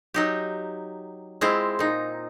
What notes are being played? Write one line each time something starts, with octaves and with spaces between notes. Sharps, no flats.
F#3 D#4 G4
G#3 C4 E4 F4
A#2 D#4